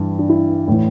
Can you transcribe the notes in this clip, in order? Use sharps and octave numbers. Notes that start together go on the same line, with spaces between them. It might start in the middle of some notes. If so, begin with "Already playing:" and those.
Already playing: G2 E3 D4
D4
E4
A2 E3